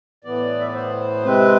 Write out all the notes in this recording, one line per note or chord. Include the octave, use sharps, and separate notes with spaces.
A2 E3 B3 D5
E5
D5
C5
C3 G#3 C4 B4